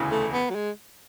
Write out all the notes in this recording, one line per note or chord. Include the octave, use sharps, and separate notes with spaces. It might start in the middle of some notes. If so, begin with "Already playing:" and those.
Already playing: E1 D2 C#3 E3
A3
B3
F#3
G#3